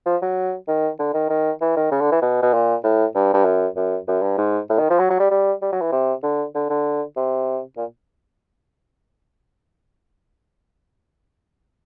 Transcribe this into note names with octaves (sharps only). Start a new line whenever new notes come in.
F3
F#3
D#3
D3
D#3
D#3
E3
D#3
C#3
D3
E3
B2
B2
A#2
A2
G2
G2
F#2
F#2
F#2
G2
G#2
A2
D#3
F3
F#3
F#3
G3
G3
G3
F#3
E3
C3
D3
D3
D3
C3
A#2